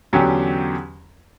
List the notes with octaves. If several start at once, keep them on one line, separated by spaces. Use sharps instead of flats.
E2 D3 F#3 C#4 G4